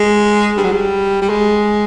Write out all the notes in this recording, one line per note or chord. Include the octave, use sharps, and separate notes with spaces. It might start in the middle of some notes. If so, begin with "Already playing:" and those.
Already playing: G#3
G3
F#3
G3
G3
G#3